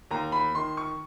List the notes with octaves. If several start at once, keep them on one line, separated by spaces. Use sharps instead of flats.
D#2 A#5
B5
D#3 C6
C#6